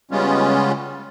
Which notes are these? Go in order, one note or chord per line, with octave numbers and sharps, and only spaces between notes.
C#3 G3 G#3 B3 C#4 F4